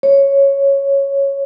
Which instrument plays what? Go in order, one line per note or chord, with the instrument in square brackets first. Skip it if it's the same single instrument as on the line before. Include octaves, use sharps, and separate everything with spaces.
[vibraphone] C#5